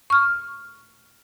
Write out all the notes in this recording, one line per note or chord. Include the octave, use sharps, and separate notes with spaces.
C#6 F6